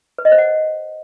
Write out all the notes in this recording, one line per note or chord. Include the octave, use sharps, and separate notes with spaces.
B4
D#5
C5
F#5